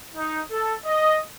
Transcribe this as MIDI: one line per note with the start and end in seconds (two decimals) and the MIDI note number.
0.15 0.40 63
0.51 0.73 69
0.84 1.20 75